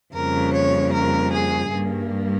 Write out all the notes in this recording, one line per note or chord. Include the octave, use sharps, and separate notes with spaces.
F2 C#3 G3 A#3 A#4
C#5
A#4
G#4
G2 G3 A#3